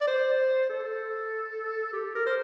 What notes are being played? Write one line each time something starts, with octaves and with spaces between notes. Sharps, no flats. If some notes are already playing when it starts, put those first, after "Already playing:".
D5
C5
A4
G4
A#4
C5